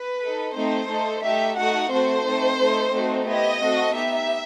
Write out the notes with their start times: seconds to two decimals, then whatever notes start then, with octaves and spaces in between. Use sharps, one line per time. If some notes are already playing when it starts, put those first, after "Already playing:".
Already playing: B4
0.21 D#4 A4
0.54 A3 C4 D#4 C5
0.88 A3 D#4 A4
1.23 A3 D#4 G4 E5
1.56 A3 D#4 F#4 A4 F#5
1.90 A3 C4 F#4 A4 C5
2.25 A3 C4 D#4 A4
2.58 A3 D#4 A4
2.92 A3 C4 D#4 F#4 A4
3.26 B3 E4 G4 D#5
3.60 A3 C4 F#4 A4
3.95 B3 D#4 G4 E5